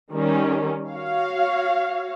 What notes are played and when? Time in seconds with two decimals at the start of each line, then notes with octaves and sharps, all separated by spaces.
0.12 D#3 G3 C#4
0.91 F#4 C#5 F5